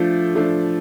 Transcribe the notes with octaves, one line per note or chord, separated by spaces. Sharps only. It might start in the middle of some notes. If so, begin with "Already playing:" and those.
Already playing: F3 A3 D4
F3 A3 D4